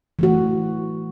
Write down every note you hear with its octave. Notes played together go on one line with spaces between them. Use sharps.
E3 A3 F#4